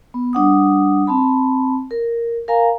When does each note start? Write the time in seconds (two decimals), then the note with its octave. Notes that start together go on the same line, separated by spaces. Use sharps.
0.14 B3
0.33 G3 D4 F#5 D#6
1.07 C4 A5 B5
1.91 A#4
2.48 A#4 F5 G#5 A#5